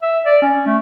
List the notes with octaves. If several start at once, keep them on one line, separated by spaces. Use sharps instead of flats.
E5
D5
C#4
A3